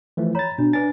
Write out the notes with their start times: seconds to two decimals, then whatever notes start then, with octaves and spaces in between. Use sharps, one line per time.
0.17 E3 F3 A3
0.35 C#5 A#5 B5 A6
0.58 B2 D4
0.73 D4 B4 G#5 A6